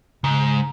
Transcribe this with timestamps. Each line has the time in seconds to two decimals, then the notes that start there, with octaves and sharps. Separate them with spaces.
0.23 G#2 C#3